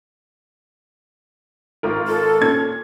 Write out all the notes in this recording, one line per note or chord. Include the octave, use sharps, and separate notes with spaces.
G#1 F4 A#4
A4
A#2 C#4 G#6